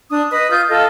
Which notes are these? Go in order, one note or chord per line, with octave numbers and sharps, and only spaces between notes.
D4 D#6
B4 D#5 D#6
F4 D#6 G6
F4 A4 D#5 F5